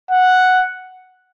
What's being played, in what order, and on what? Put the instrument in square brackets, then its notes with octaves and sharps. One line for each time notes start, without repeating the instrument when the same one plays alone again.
[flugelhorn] F#5